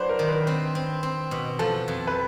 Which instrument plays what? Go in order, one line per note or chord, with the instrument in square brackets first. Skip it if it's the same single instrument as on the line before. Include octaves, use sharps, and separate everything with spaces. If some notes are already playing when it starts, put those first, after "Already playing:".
Already playing: [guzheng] F#3 D4 [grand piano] B4 C5
[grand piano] A#4
[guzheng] D#3
[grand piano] A#4
B4
[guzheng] C4
C4
C4
B2
[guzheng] F3 [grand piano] A4
[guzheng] F2
[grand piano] B4